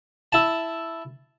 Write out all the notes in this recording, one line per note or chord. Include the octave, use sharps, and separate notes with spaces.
E4 A5